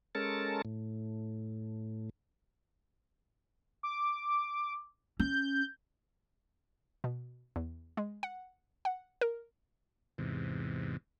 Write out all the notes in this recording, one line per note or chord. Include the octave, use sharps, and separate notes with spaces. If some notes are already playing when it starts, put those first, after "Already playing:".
G#3 C#4 A4 A#4 A5
A2
D6
C#4 G6
B2
E2
G#3
F#5
F#5
A#4
E2 G#2 C3